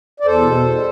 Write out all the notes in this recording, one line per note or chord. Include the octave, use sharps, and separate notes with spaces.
D5
E2 A4 C5
B2
E2
G3